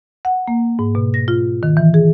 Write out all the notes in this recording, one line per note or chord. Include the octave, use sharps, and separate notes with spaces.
F#5
A#3
G#2
B2
A#6
F4
D#3
E3
G#4